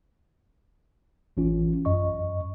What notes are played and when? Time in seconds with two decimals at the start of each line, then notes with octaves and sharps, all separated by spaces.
1.37 A1 E3 C#4 F4
1.85 F#2 D#5 C#6